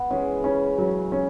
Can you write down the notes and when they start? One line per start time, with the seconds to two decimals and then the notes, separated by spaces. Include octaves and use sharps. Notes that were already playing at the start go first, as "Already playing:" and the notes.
Already playing: B3
0.10 E3 G#3 C#4
0.44 C#3 C#4
0.78 C#3 F#3
1.12 C#4